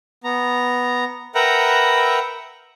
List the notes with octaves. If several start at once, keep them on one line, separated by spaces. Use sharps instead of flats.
B3 A#5
A#4 B4 E5 F#5 G5 A#5